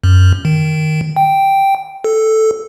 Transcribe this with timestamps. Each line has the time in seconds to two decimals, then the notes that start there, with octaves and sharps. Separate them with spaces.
0.04 F#2
0.45 D#3
1.16 G5
2.04 A4